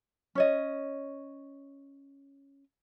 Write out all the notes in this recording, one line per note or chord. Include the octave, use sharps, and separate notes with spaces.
C#4 C#5 D#5